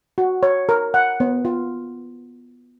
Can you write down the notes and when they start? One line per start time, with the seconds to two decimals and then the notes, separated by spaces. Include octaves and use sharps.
0.18 F#4
0.43 C#5
0.69 A#4
0.94 F#5
1.20 B3
1.45 F4